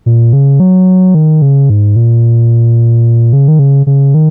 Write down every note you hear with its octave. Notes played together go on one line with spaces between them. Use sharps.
A#2
C#3
F#3
D#3
C#3
G#2
A#2
C#3
D#3
C#3
C#3
D#3